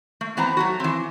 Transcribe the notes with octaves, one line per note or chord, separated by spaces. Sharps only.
A3
E3 B3 C4 A#5
F#3 A3 F#4
E3 C4